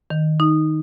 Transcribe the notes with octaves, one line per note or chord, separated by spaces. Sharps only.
D#3
D#4